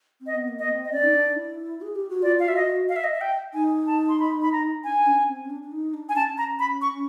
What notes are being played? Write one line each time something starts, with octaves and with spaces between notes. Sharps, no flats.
C4
D#5
B3
A#3
D#5
B3
C4
D#5
C#4 D5
D#4
D4
E4
G#4
G4
F#4
F4 D5
F5
F#4 E5
D#5
F#4
F5
E5
D#5
E5
G5
D#4 G#5
A5
C6
B5
B5
A#5
D4 G#5
C#4
C4
C#4
D4
D4
D#4
D4
G#5
C#4 A5
A#5
B5
C#6